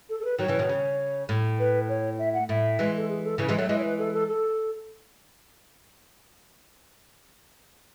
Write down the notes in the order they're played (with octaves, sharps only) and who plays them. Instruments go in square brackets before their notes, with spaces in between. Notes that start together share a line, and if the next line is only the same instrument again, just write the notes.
[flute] A4
A4
B4
[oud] D#3 F#3 [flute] C#5
[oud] C#3 E3
B2 D#3
C#3
A2
[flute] B4
C#5
E5
F#5
[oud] A2 [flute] E5
[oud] E3 G#3
[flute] A4
G#4
A4
[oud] C#3 E3
E3 G#3
[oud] F#3 A3 [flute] C#5
[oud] E3 G#3 [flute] D#5
[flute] C#5
B4
A4
A4
A4